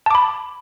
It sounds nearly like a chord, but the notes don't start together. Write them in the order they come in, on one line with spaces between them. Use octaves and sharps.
A5 D6 B5